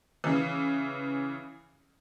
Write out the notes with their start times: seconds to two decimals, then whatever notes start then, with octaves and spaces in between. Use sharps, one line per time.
0.24 C#3 E3